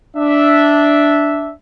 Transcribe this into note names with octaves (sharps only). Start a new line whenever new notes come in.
D4 E5